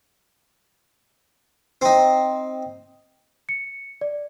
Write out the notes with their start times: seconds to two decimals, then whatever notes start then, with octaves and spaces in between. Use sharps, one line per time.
1.82 C4 D#4
3.49 C#7
4.01 D5